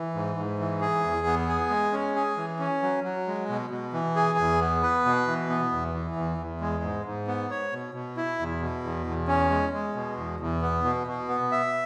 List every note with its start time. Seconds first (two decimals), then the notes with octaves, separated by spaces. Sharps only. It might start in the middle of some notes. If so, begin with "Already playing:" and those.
Already playing: E3
0.14 G#2
0.37 G#2
0.59 E3
0.81 G#4
1.04 E2
1.26 B3
1.49 G#4
1.70 G#3
1.93 C#4
2.15 G#4
2.37 E3
2.59 C#4
2.82 F#3
3.04 F#3
3.27 G#3
3.49 B2
3.70 B2
3.93 E3
4.16 G#4
4.38 E2
4.60 B3
4.83 B4
5.05 B2
5.27 E3
5.49 B3
5.72 E2
5.94 E3
6.16 E2
6.38 E2
6.61 G#3
6.83 G#2
7.05 G#2
7.27 B3
7.50 C#5
7.72 B2
7.94 B2
8.17 E4
8.39 E2
8.61 B2
8.83 E2
9.06 E2
9.28 C#4
9.50 G#3
9.73 G#3
9.95 B2
10.17 E2
10.40 E2
10.62 B3
10.84 B2
11.07 B2
11.28 B3
11.52 E5